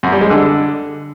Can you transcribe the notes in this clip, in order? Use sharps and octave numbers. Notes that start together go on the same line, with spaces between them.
F#2
G3
G#3
D3